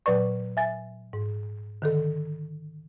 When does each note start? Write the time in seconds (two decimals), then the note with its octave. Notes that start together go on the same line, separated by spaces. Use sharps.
0.06 A#2 F#3 B4 D5 C#6
0.57 E5 G#5 A6
1.13 G#2
1.82 D3 D#3 A4